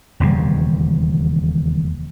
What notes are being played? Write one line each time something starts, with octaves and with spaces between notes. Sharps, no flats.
E1 D#2 C#3 G3